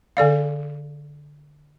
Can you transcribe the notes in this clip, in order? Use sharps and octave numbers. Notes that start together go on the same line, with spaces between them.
D3 A4 D5 F5